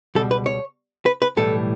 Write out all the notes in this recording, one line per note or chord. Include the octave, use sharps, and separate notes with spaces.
C#2 B2 G3 A4
B4
C#5
B4
B4
B1 A2 E3 G3 A4